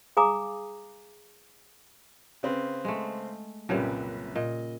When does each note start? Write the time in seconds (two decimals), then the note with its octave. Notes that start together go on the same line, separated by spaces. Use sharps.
0.17 G#4 F5 G#5 A#5 D6 D#6
2.43 C#3 C4 B4
2.85 G#3 A3
3.69 C2 F#2 A#2 C#3 G3 B4
4.36 A#2 D#5